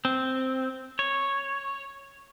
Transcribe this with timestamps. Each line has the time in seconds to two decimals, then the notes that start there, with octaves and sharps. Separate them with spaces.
0.05 C4
0.99 C#5